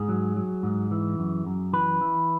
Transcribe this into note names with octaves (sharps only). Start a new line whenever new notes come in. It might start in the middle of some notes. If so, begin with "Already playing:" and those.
Already playing: G#2 G#4
F#3
F#3
G#2
E3
F#2
F#2
E3 B4
E3